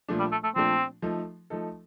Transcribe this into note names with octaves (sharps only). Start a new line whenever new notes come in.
A#2 F3 A3 D4
G3
A3
A3
A#2 F3 A3 C4 D4
F3 A3 D#4 A4
F3 A3 D#4 A4